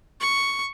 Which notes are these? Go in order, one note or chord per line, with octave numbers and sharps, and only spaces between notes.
C#6